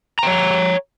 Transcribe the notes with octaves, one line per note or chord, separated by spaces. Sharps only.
C#5 G5 A#5